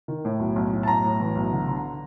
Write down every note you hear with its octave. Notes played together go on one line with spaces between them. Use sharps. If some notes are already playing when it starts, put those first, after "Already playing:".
D#3
A2
B1
B1
A2
A5
B1 A#5
A2
E3
B1
D3
D3